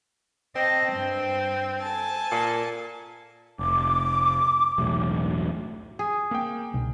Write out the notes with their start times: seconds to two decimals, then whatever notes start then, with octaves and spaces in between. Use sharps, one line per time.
0.56 C4 D#5 G5 A5
0.93 G2
1.82 A4 G#5 A5
2.31 A#2
3.59 F1 D6
4.78 E1 B1 A2
5.99 G#4
6.31 A#3 C4 G5
6.73 C2 B2